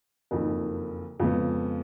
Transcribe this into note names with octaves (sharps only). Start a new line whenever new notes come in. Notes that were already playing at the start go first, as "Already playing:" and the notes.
F#1 F2 D#3
F2 C#3 G#3 B3